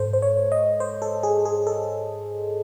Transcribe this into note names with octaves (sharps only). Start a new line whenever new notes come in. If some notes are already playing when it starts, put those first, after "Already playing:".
Already playing: G#2 A4 C5
C5
C#5
D#5
C5
A4
G#4
G#4
A4